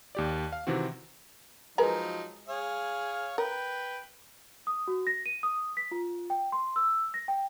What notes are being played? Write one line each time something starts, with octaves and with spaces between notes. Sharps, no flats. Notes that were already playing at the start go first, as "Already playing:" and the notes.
D#2 G4 D5
F5
C3 D#3 E3 C4 F#4
F3 F#3 G#3 D#4 A#4 B4
G#4 C#5 F5
A#4 B4 G5
D#6
F#4
A#6
D#7
D#6
B6
F4
G5
C6
E6
A#6
G5